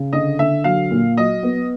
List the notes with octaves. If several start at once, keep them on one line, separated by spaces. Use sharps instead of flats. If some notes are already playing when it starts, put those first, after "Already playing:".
Already playing: C#3
D3 D#5
D3 E5
F#3 F5
A#2
F#3 D#5
B3